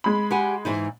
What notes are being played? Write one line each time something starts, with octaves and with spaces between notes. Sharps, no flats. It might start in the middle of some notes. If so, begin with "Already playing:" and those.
G#3 B5
G4 F#5 G#5
G#2 E3 D#4